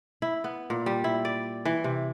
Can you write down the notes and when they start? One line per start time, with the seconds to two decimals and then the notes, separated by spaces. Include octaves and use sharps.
0.22 E4
0.44 B3
0.70 A#2
0.86 G3
1.04 E4
1.25 D5
1.65 E3
1.84 C3